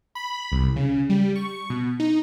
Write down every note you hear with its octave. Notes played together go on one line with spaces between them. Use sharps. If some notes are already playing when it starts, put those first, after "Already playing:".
B5
C2
C#3
G3
C#6
B2
D#4